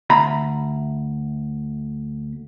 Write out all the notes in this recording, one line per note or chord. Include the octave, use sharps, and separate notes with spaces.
D2 A#5 B5